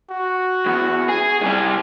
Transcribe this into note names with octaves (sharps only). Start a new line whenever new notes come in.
F#4
E2
G#4
C2 G3 G#5